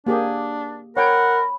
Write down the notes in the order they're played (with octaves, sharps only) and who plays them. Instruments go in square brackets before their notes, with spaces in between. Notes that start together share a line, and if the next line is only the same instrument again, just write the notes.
[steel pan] A#3 G4 G#4 [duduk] D4
[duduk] A#4 [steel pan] C#5 G5 [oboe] F#5 [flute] B5